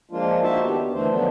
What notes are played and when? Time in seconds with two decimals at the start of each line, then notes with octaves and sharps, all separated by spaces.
0.11 F3 G#3 A#3 D4 F4
0.43 A#3 D#4 F#4 C5 E5 A5
0.63 D#3 B3 D4 G4
0.78 D#2
0.93 D3 E3 A3 D4 C5
1.10 D3 D#3 F3 F#3 B3 D4